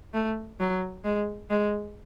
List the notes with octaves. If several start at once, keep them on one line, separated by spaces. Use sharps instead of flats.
A3
F#3
G#3
G#3